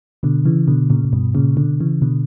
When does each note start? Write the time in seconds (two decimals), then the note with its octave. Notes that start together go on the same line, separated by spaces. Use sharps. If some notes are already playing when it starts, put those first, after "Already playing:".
0.23 B2 D3
0.45 C#3 E3
0.68 B2 D3
0.90 A#2 C#3
1.04 A#2
1.13 G2 B2
1.35 A#2 C#3
1.57 B2 D3
1.80 C#3 E3
2.02 B2 D3